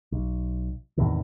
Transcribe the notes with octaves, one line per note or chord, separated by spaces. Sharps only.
B1
E2 A2 C3 D#3